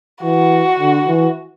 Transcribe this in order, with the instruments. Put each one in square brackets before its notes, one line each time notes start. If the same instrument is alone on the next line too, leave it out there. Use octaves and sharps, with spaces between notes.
[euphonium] E3 [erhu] F#4
[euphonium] D3
E3